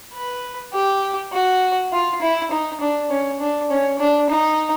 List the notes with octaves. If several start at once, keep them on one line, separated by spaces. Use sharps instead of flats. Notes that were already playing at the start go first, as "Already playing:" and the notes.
B4
G4
F#4
F4
E4
D#4
D4
C#4
D4
C#4
D4
D#4